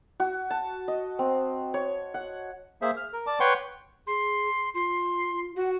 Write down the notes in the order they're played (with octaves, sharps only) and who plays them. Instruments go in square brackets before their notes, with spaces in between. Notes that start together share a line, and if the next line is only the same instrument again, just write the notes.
[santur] F#4
A5
D#5
C4
C#5
F#5
[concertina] A#3 G#4 C5 E5
F6
A#4
D5 A5 D6
B4 C#5 F#5 G5 C6 C#6
[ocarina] G#4 [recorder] C6
[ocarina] F4 [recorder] C6
[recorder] F#4 [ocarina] F#5